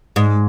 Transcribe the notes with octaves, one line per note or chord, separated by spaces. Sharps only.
G#2